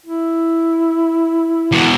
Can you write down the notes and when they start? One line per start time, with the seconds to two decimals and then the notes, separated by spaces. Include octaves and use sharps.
0.06 E4
1.72 E2 B2